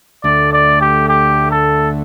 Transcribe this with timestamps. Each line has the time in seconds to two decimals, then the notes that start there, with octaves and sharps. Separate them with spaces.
0.24 D2 D3 A3 D5
0.53 D5
0.81 G4
1.09 G4
1.51 A4